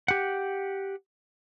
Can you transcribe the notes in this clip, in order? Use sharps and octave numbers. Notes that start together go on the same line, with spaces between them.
G4 F#5